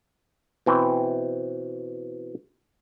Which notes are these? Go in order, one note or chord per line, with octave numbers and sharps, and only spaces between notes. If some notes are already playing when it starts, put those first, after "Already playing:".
B2 E3 C4